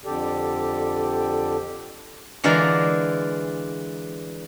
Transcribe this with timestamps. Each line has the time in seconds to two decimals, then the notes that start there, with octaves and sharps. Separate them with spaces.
0.05 F2 D3 G4 A4 D5
2.44 D3 E3 G#3 F4 A#4 D5